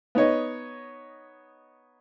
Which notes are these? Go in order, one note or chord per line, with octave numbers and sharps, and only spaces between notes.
B3 D#4 C#5 D#5